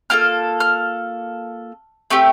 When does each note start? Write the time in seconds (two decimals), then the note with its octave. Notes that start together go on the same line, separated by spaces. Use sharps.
0.10 A#3 F4 A4 F6
0.60 F6
2.10 A3 C4 G4